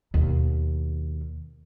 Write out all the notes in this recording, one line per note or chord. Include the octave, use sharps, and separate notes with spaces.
D#2 B2